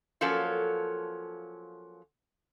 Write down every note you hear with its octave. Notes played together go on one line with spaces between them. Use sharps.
F3 F#3 A#3 C#4 A4